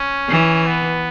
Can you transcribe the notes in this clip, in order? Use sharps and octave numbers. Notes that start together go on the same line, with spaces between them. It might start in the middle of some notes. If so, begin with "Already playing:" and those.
Already playing: C#4
E3
B3